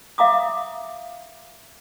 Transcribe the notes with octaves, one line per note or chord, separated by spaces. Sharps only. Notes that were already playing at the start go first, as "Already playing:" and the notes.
E5 F5 A#5 D6 D#6